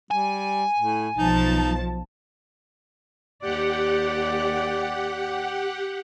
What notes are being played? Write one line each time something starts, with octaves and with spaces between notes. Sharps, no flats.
G3 G#5
A2
B1 F3 D#4 A5
D#2 G4 D5 F#5